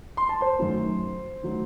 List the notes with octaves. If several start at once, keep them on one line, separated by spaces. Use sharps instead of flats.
C6
A5
C5 C6
F#2 D#3 F#3 A3
D#3 F#3 A3